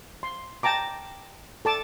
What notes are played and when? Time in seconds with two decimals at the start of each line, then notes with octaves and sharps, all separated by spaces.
0.23 C6
0.63 G5 A5 A#5 D6
1.65 A4 A5 D6